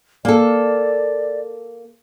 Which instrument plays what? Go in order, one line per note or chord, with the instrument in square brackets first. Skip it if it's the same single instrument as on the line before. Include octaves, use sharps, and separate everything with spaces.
[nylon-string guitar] A#3 A4 [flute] D5